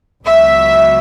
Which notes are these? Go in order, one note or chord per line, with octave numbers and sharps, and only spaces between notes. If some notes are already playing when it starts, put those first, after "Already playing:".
C#2 B2 F#3 E5